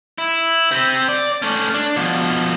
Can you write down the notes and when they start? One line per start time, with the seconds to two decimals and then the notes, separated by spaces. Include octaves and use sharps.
0.18 E4
0.71 C4 G4
1.09 D5
1.42 A3 C#4
1.74 D4
1.96 B2 F3